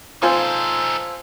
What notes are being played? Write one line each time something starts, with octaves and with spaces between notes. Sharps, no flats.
D#4 F4 A4 C5 G#5